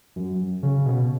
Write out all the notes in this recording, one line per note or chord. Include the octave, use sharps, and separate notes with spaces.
F#2
C#3
B2